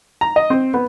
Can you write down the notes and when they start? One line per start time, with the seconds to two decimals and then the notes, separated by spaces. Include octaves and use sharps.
0.21 A#5
0.36 D#5
0.50 C4
0.74 B3